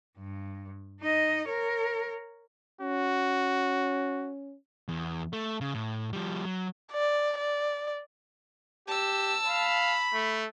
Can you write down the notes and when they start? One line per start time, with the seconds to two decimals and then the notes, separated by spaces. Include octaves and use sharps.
0.18 G2
1.00 D#4 D#5
1.48 A#4 C#5
2.81 C#4 F#4
4.88 E2
5.33 A3
5.61 C#3
5.74 A2
6.13 F3 G3
6.45 F#3
6.92 D5
7.38 D5
8.88 G4 A5 E6
9.47 F5 B5
10.13 A3